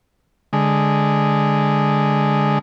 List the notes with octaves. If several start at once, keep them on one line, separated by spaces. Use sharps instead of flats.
D3 G#3